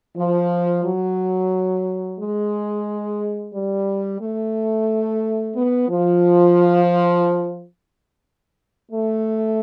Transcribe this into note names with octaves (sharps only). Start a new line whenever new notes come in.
F3
F#3
G#3
G3
A3
B3
F3
A3